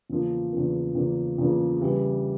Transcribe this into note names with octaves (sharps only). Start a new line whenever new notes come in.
E2 C#3 F3 A#3
E2 C#3 F3 A#3
E2 C#3 F3 A#3
E2 C#3 F3 A#3
C#3 E3 G3